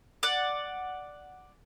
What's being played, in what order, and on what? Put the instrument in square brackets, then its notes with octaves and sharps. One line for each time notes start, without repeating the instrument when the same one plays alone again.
[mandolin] D5 F#5